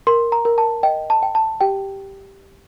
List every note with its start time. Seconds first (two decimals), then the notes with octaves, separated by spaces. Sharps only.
0.07 A#4 C6
0.32 A#5
0.45 A#4
0.58 A5
0.83 D#5 G5
1.10 A5
1.23 G5
1.35 A5
1.61 G4 G5